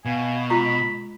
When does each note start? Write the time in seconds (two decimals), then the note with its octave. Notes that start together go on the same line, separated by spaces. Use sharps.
0.05 B2 F5 G#5
0.50 G#3 F4 A#5 B5